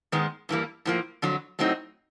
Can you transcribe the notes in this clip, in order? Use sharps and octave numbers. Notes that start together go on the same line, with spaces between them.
G#2 D#3 G#3 B3
G2 E3 G3 A#3
A2 F3 A#3
F2 D3 F#3
A2 F#3 A3 C4 D#4